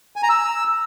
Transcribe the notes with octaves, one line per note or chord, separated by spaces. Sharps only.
G#5
A#5
E6